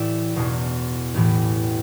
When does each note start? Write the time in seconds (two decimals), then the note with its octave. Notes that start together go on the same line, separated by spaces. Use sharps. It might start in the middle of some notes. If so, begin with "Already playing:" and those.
Already playing: A1 A2 E3 D5 E5
0.36 E1 E2 B2
1.14 A1 A2 E3